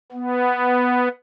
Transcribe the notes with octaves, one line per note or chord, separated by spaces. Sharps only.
B3